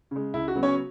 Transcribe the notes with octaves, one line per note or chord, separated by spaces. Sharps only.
C#3 G#3
C#2 E4
F#4
C#3 F#3 B3
C#4 C#5